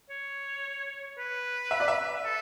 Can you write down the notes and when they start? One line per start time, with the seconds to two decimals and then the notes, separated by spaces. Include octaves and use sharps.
0.10 C#5
1.18 B4
1.71 E5
1.80 D5
1.88 E5
2.25 A4